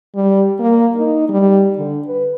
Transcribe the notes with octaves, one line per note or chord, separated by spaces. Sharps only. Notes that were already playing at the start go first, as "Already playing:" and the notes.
G3
A#3
D#4
G3
D3
B4